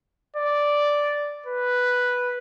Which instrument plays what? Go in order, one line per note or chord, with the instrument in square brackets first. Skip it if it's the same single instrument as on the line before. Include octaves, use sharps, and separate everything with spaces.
[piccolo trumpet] D5
B4